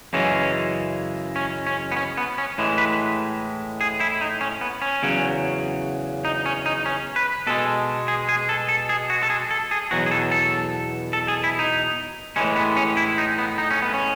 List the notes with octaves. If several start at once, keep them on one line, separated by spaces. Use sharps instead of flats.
F#2 C#3 E3 G#3 C#4
C#4
C#4
B3
C#4
B3
C#4
A2 E3 G#3
B4
G#4
E4
D#4
C#4
B3
C#4
E2 C#3 F#3
D#4
C#4
D#4
C#4
B4
B2 G#3 A4
G#4
G#4
A4
A4
G#4
F#4
A4
G#4
A4
G#4
E2 B2 F#3 F#4
G#4
A4
A4
A4
G#4
E4
D#4
A2 E3 G#3 C#4
B3
C#4
E4
D#4
B3
D#4
C#4
B3
C#4